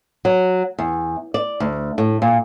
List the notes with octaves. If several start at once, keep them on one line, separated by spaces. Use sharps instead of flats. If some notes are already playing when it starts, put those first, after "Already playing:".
F#3
E2
D5
D2
A2
A#2